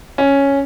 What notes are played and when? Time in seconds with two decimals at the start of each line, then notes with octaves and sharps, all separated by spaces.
0.18 C#4